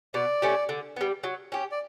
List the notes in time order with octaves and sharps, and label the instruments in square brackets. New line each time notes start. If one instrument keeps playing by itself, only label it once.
[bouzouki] B2 [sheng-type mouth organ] D5
[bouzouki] A3 C#4 G4
D3
G3 B3
F#3
C#4 G4
[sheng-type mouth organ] D5